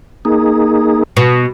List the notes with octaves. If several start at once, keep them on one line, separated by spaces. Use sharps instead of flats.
A#3 D#4 G#4
B2